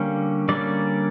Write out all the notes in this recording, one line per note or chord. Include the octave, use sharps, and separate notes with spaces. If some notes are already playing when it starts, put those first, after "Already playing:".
Already playing: D3 G3 A#3 C#4
D3 G3 A#3 C#4 D5